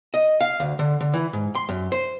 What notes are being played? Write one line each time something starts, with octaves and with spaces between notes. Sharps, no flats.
D#5
F5
D2
D3
D3
E3
G#2
C6
F#2
C5